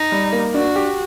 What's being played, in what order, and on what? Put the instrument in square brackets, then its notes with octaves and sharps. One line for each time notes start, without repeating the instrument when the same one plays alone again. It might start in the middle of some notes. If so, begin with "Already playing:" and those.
Already playing: [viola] D#4
[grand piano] G3
A#3
[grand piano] D4 [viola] F#4
[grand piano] G4